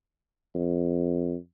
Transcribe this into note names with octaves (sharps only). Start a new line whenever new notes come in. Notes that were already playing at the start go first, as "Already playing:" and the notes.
F2